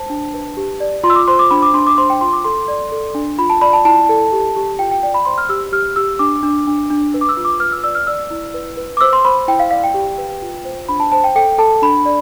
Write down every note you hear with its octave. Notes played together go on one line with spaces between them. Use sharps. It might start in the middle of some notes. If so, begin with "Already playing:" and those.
Already playing: C5 A5
D4
B4
G4
D5
F4 C6
E6
D6
C5 C6
D6
D4 B5
D6
D4 C6
D6
C5 C6
G5
F4 C6
D6
A4 C6
D5
A4
D4
F4 B5
A5
D5 B5
A5
E4 A5
A4
G4
G4
F4 G5
G5
D5 G5
B5
C5 C6
F6
G4 E6
G4 F6
G4 E6
D4 D6
D4
D4
D4
B4
D6
E6
F4
D6
B4 F6
E6
D5 E6
F6
D5 E6
E4
B4
B4
D6
C5 E6
C6
C5 B5
E4 G5
F5
D5 F5
G5
G4
B4
F4
C5
D4 B5
A5
C5 A5
G5
A4 G5
A4 A5
D4 B5
D5